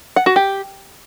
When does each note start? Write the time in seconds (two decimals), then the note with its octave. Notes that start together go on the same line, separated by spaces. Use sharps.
0.16 F#5
0.26 F#4
0.36 G4